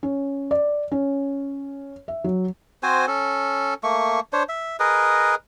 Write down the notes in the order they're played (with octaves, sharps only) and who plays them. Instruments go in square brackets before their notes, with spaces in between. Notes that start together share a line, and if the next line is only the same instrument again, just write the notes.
[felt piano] C#4
D5
C#4
E5
F#3
[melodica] C4 F#4 C5 G#5
C#4 A4
A3 A#3 C#6
D4 C5 C#5
E5
G#4 A#4 B4 D#5